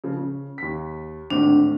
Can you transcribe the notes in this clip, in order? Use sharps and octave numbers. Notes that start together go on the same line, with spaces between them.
C#3 F3
C#3
D#2 B6
G#1 D2 A2 D4